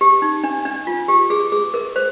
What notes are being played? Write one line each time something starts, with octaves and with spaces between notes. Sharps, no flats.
G4
D#4
D4
D4
F4
G4
G#4
G#4
A#4
C5